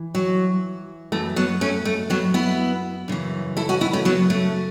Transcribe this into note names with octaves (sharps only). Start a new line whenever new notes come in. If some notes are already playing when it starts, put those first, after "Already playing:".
Already playing: E3
F#3
F#2 E3 A3
F#3 B3
A3 C#4
A3
F#3 B3
B3 E4
F#2 C#3 E3
E4 A4
C#4 F#4
B3 E4
A3 C#4
F#3 B3
A3 C#4